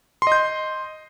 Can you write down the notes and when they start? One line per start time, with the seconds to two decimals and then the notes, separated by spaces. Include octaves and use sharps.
0.22 C6
0.27 D#5
0.32 G6